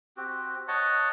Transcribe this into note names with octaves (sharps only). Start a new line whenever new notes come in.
C4 F#4 G4
C#5 D#5 F#5 A5